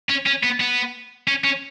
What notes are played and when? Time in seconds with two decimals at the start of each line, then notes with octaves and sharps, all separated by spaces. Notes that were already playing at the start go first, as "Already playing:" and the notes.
0.09 C#4
0.26 C#4
0.43 B3
0.60 B3
1.28 C#4
1.44 C#4